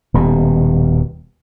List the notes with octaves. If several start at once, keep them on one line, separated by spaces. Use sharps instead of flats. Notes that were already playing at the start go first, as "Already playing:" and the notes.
D#1 B2 G3